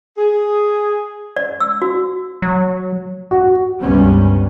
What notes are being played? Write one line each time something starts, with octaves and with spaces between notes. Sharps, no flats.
G#4
D5
E6
F#4
F#3
F#4
C#2 G2 C3 G3 B3 C#4